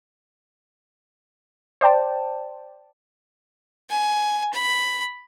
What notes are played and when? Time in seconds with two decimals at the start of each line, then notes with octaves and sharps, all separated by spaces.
1.81 C5 D5 G5 A5
3.90 G#5
4.53 B5